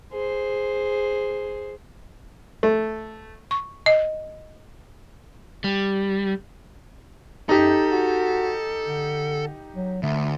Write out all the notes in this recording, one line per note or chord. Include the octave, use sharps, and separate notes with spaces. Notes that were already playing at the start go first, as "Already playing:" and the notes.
G#4 C5
A3
C#6
D#5
G3
F#2 D#4 G4 A4
F#4
D3
F#3
D2 A3